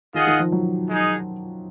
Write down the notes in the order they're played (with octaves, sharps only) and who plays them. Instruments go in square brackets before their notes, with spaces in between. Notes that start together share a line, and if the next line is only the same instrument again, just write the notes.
[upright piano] D#3 [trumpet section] F4 G#4 D#5 F#5
[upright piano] D#3
F3
F#3
[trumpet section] G#3 D#4 G#4